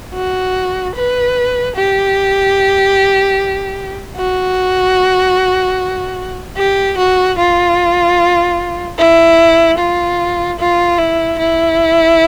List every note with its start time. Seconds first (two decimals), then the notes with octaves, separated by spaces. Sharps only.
0.15 F#4
0.96 B4
1.76 G4
4.17 F#4
6.57 G4
6.98 F#4
7.38 F4
8.99 E4
9.79 F4
10.60 F4
10.99 E4
11.39 E4